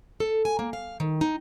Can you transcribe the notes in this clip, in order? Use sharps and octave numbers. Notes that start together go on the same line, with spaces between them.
A4
G#5
A#3
F5
D#3
D#4